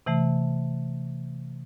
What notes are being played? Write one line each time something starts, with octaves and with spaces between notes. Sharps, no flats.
C3 E3 A3